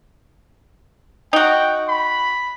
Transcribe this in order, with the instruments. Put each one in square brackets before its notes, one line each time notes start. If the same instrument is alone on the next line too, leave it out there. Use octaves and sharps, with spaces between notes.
[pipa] D#4 F#4 [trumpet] G5
[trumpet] B5